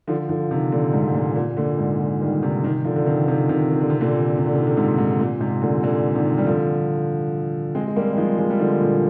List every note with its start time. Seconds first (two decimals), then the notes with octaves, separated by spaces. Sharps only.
0.08 D3 F3
0.29 D3 F3
0.51 C3 D#3
0.72 A#2 D3
0.93 G#2 C3
1.08 G#2
1.14 A#2
1.36 A#2
1.57 A#2 D3
1.78 G#2
1.99 A#2
2.22 D#3 G3
2.42 C3 D#3
2.64 C3 D#3
2.85 D3 F3
2.96 D3
3.06 C3 D#3
3.27 C3 D#3
3.49 C3 D#3
3.70 D#3
3.81 D3
3.90 C3
4.01 A#2 D3
4.39 C3
4.47 D3
4.55 C3 D#3
4.67 D3
4.77 G#2 C3
4.98 G#2
5.20 A#2
5.40 G#2 C3
5.62 A#2 D3
5.83 A#2 D3
6.15 C3 D#3
6.38 G3
6.47 D3 F3
7.75 G#3 C4
7.87 G#3
7.96 G3 A#3
8.13 G3
8.17 F3 G#3
8.38 F3 G#3
8.50 G3
8.59 D3 F3
8.81 A#2 D3